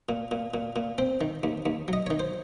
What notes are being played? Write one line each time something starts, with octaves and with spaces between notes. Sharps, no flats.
A#2
A#2
A#2
A#2
C4 C5
D#3
D#2
D#2
F#3 D#5
D#3 C#5
C5